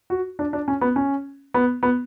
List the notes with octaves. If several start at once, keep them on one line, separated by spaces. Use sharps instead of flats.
F#4
D4
D4
C#4
B3
C#4
B3
B3